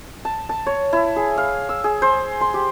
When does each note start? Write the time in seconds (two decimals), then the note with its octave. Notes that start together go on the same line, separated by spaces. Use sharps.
0.25 A5
0.49 A5
0.67 C#5
0.93 E4
1.16 G#4
1.38 F5
1.69 E6
1.84 G#4
2.02 C5
2.41 C6
2.54 G4